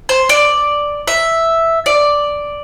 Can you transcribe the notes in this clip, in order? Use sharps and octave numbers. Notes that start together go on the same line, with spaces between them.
C5
D5
E5
D5